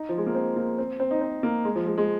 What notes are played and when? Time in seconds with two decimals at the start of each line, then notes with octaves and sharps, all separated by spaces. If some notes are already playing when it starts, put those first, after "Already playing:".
Already playing: D#4
0.09 F3
0.18 G#3
0.26 A#3
0.35 C4
0.56 A#3
0.78 C4
1.00 C4
1.11 D#4
1.21 C4
1.43 A#3
1.65 G#3
1.75 F3
1.87 G#3
1.98 G#3